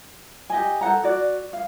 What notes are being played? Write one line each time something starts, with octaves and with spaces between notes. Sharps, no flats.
G4 D#5 G#5
A4 C5 F#5 A#5
F#4 D5
F5